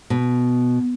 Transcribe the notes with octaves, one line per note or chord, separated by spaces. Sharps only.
B2